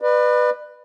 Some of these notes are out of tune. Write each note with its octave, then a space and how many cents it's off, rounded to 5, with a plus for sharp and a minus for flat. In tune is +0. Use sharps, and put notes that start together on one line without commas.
B4 +0 D5 +40